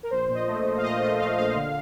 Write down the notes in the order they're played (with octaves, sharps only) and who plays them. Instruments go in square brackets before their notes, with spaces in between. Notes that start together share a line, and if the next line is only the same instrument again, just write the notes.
[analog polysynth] A#4
A#1 C5
A#2
D#5
A3
A3
F5
A#2 D#5
A3 D#5
A3 F5
A#1 F5
D3